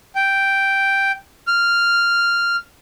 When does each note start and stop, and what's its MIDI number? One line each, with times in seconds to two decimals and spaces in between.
0.15 1.12 79
1.47 2.56 89